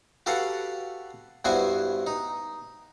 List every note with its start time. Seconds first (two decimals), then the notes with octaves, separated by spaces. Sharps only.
0.26 F#4 G4 A4 B4 F5 F#5
1.45 G2 B3 E4 F#4 C5 G#5
2.07 D#4